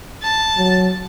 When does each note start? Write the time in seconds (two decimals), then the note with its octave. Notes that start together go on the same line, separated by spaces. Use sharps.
0.22 A5
0.57 F#3